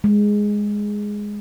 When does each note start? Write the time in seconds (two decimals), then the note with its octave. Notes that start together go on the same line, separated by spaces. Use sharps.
0.04 G#3